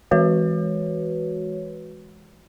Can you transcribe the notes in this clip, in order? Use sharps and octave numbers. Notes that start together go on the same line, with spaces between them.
E3 G#3 F#4 B4 C#5